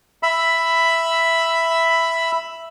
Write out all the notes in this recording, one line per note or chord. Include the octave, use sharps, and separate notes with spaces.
E5 B5